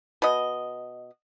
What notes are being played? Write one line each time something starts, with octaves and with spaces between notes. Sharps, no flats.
B2 D#5